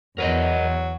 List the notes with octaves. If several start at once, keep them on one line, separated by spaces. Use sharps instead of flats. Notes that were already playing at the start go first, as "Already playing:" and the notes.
E2 F#3 A#4 B4 D#5